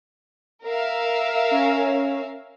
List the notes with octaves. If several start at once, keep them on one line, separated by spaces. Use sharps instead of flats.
A#4 E5 F5
C#4